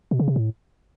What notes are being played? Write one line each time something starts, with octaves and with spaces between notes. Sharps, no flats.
B2
C#3
C3
A2